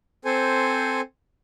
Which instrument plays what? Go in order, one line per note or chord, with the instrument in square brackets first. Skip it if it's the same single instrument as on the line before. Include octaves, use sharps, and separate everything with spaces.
[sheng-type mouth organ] C4 A4 C5 G#5